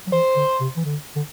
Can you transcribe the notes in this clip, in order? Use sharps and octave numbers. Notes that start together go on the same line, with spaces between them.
F#3
E3 C5
D3
C3
E3
D3
D3